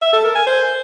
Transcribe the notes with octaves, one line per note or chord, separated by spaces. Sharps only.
E5
A4
A#4
G#5
C5